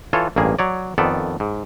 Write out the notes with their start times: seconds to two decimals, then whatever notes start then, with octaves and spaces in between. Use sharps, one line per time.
0.13 E3 F4 A4 C#5
0.36 A1 G2 A#3 G#4 G#5
0.59 F#3 C#5 D5
0.98 F2 D#3 B3 A4 D5
1.40 G#2